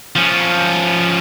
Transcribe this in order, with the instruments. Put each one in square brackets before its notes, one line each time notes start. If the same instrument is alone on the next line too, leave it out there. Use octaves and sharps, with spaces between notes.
[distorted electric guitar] F3 C#4